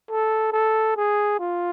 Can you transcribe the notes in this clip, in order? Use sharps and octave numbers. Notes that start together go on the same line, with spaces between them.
A4
A4
G#4
F4